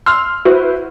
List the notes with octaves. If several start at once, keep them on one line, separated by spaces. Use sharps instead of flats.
C6 E6 F6
E4 F#4 B4 C5